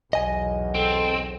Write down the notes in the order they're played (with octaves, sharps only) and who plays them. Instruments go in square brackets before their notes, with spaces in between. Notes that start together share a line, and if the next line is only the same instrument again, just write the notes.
[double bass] B1 E2 [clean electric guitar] D#5 G#5
[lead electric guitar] C4 [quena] A4